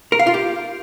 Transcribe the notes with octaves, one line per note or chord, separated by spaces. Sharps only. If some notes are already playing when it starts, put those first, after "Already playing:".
A#4
F5
F4
G4